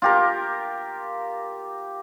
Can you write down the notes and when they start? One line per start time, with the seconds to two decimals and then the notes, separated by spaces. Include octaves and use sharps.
0.02 F4 G4 A#4